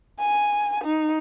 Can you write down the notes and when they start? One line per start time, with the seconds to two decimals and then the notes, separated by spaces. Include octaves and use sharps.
0.20 G#5
0.84 D#4